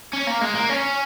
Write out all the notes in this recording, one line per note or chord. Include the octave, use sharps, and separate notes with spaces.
C#4
A#3
G#3
A#3
C#4